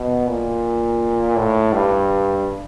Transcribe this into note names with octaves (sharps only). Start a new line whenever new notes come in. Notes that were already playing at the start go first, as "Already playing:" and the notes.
Already playing: B2
A#2
A2
G2